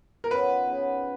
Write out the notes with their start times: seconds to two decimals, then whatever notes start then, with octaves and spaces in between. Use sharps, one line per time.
0.24 A#4
0.30 C#3 F3 B3 D#4 B4
0.66 C#3 F3 B3 D#4